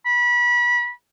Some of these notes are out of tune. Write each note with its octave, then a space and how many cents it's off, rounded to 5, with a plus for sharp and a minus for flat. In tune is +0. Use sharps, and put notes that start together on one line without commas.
B5 -30